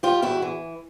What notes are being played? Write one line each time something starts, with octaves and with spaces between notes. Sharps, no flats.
G3 F4 G4
E2 E4 F#4
E3